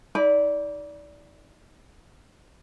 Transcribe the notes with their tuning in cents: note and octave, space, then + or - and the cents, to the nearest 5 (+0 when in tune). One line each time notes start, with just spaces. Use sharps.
D#4 +35 D5 -20 B5 +0